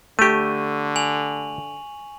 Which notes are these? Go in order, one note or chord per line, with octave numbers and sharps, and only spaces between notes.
D3 A3 G4 C#6 D#7
G#5 F7 F#7